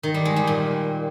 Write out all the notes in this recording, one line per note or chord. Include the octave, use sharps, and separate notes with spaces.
D#3
G3
G#3
G3
A#2